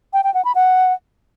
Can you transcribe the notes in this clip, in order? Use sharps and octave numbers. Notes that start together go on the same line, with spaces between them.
G5
G5
F#5
B5
F#5